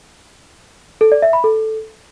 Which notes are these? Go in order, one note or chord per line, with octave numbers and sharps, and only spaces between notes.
A4
D5
E5
B5
A4